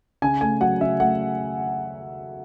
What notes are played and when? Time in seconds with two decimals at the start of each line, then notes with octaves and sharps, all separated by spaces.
0.22 C#3 G#5
0.41 A3 G#5
0.61 F#3 F#5
0.80 C#3 E5
1.00 A3 F#5